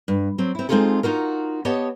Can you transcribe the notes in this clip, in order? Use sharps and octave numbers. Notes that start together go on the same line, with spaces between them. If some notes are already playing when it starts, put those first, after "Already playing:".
G2
F#3 C4
C4 E4
G#3 C4 D#4 F4 G#4 A4
D#4 F4 F#4 A#4
B3 G4 C#5 D#5 A5